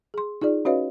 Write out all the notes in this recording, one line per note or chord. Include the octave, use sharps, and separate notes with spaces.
G#4 C6
D#4 F4 G#4 D5
C#4 F#4 B4 C#5 D#5 F5